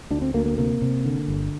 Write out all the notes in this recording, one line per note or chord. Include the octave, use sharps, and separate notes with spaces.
D2 D4
C4
D2 A#3
A#3
C3 A#3
C3
D3
G1